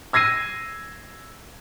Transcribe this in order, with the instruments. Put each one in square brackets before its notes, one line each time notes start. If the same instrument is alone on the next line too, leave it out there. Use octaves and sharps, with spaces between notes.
[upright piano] E6 G#6 A#6 C7 D#7